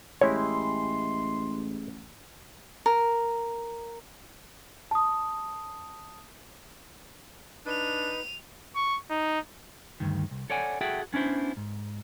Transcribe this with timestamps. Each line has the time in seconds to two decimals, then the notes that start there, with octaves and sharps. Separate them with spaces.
0.21 A1 G#3 E4 G4 C#5 C6
2.86 A#4
4.91 A5 D#6
7.66 D4 D#4 B4 D#7 F7
8.76 C#6
9.10 D#4
10.00 D2 G2 D#3
10.31 C2
10.50 A4 C#5 D5 F#5 G#5
10.81 F#4 G#4 A4 E5 F#5 G5
11.13 B3 C#4 D4 E4 C5
11.57 G#2